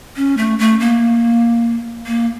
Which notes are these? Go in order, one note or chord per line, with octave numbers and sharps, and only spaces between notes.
C#4
A3
A3
A#3
A#3